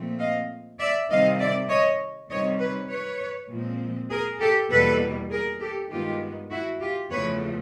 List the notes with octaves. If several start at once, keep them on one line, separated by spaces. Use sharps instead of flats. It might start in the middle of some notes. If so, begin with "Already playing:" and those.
Already playing: A#2 F3 A3 C4
D#5 F5
D5 E5
C3 D#3 G3 C4 D#5 F5
D5 E5
C#5 D#5
C3 D#3 G3 C4 C#5 D#5
B4 C#5
B4 C#5
A#2 F3 G#3 C4
G#4 A#4
G4 A4
E2 B2 G3 A#3 A4 B4
G#4 A#4
G4 A4
G2 D#3 G#3 B3 F4 G4
E4 F#4
F4 G4
E2 C#3 F3 A3 B4 C#5